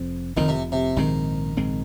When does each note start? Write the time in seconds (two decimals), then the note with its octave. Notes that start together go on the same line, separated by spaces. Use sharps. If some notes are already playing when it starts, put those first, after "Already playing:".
Already playing: F1 F2 F3 C4
0.36 F1 F2 D#3 F3 C4
0.48 C3
0.72 C3
0.96 A#1 G#2 D#3 G#3 C4
1.57 A#1 G#2 G#3 C4